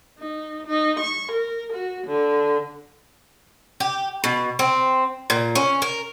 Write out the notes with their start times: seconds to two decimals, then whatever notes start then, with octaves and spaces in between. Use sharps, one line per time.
0.18 D#4
0.67 D#4
0.99 C#6
1.31 A#4
1.73 F#4
2.07 D3
3.80 G4
4.24 B2
4.59 C4
5.30 A#2
5.55 C#4
5.82 A#4